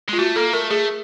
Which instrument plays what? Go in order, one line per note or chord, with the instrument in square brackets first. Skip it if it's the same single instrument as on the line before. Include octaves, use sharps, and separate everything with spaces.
[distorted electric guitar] G#3 [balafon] F4
[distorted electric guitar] A3 [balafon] F#4
[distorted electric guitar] A#3 [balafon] A4
[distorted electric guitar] A3 [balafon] A#4
[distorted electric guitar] A3 [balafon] G#4